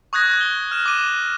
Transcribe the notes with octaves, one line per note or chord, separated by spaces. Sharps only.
C#6 D#6 F#6 G#6 A#6
G7
F6 E7
D6 D#7